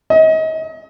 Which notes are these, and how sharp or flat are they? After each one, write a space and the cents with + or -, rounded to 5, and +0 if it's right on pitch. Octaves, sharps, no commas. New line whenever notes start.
D#5 +35